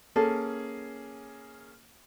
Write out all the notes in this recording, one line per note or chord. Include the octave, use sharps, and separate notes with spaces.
A#3 C#4 G#4 A4